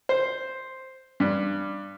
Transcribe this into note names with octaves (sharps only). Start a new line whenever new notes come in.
C5
G2